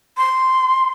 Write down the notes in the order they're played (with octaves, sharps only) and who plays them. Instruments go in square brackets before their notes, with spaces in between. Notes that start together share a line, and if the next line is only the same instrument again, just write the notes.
[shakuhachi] C6